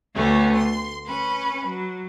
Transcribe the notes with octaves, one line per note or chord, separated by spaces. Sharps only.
D2 D3 A3 B3 C#4
C6
C#4 B4
F#3